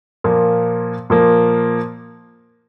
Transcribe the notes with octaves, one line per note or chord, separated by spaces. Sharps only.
A#2 F3 A#3
A#2 F3 A#3